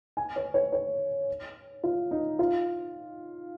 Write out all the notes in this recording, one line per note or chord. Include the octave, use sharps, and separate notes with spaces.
G#5
C#5
C#5
C#5
F4
D#4
F4